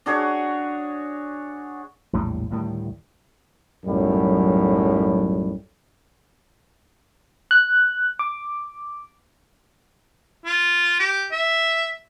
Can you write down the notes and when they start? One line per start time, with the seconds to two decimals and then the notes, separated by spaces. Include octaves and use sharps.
0.06 D4 F#4 G#4 C#5
2.13 A#1 E2 A2 G3
2.50 D2 A2 D#3 G3
3.85 B1 F#2 A2 G3
7.51 F#6
8.19 D6
10.46 F4
10.99 G4
11.32 E5